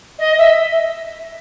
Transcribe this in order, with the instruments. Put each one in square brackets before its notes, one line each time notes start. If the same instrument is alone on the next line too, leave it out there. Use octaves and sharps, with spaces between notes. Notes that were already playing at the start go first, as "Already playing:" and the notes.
[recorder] D#5
E5